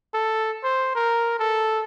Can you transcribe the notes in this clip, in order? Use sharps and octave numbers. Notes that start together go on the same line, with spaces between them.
A4
C5
A#4
A4